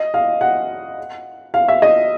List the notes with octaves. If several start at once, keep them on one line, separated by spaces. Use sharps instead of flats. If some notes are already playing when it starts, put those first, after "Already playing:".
Already playing: D#5
F5
F#5
F5
E5
D#5